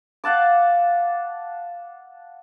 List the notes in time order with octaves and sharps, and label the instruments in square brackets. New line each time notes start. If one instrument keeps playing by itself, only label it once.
[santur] F5 F#5 A5 D6